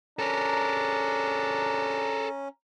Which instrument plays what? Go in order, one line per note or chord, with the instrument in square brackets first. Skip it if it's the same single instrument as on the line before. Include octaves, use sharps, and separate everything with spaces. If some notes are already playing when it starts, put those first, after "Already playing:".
[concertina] C#4 [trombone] D4 [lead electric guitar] A4 A#4 [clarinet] A#5